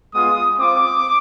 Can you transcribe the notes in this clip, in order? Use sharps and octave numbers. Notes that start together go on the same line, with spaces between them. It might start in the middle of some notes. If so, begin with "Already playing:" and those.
G#3 B3 F4 D#6
C4 F4 D6